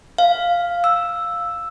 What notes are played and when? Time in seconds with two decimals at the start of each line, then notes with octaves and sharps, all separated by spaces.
0.18 F5
0.84 E6